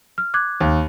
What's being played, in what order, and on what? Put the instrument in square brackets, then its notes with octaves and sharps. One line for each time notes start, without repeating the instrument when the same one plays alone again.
[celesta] F6
D6 F#6 G#6
[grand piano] D#2